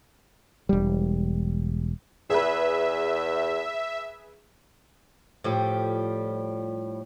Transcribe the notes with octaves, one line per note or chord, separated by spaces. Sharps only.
E1 G3
E2 G#4 B4 E5
A2 F3 G3